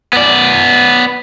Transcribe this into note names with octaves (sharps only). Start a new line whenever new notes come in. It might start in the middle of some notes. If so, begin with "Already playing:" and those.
B3 D5